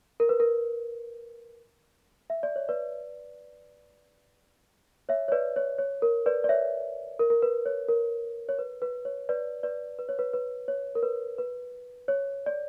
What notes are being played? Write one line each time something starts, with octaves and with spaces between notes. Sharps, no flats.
A#4
B4
A#4
E5
D5
C#5
B4 D5
C#5 E5
C#5
B4 D5
C#5
C#5
A#4
B4 D5
D5
C#5 E5
A#4
A#4
B4
C#5
A#4
C#5
B4
B4
C#5
B4 D5
B4 D5
B4
C#5
B4
B4
C#5
A#4
B4
B4
C#5
D5